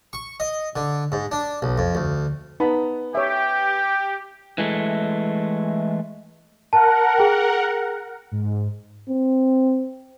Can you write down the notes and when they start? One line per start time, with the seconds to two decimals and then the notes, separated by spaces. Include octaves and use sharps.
0.13 C#6
0.40 D#5
0.76 D3
1.12 G#2
1.31 D4
1.62 B1
1.78 F2
1.95 D2
2.60 B3 D#4 A5 B5
3.15 G4 C#5 E5 G5
4.58 E3 G#3 A3
6.73 A#4 F#5 A5
7.18 G#4 G5
8.32 G#2
9.10 C4